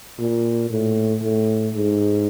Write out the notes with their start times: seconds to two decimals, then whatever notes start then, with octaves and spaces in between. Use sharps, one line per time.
0.19 A#2
0.70 A2
1.22 A2
1.74 G#2